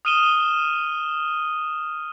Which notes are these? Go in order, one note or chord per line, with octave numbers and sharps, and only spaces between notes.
D#6 F6 D#7 E7 G7